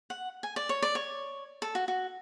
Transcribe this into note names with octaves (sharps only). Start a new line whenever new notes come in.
F#5
G#5
D5
C#5
D5
C#5
A4
F#4
F#4